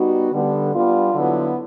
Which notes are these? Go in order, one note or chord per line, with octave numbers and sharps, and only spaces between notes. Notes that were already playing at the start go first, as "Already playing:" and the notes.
Already playing: G3 B3 D#4 F#4
D3 G3 B3
G3 B3 D4 F4
D3 F#3 B3 E4